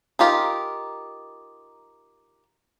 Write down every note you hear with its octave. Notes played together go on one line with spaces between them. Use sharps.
D#4 F4 G4 A#4